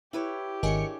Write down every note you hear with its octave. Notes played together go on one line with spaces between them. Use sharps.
E4 G4 B4 C#5
G#1 D4 G#4 A#4 C#5 D#5 G#5 C#7